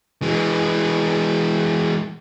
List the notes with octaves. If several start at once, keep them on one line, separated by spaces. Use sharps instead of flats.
E3 G#3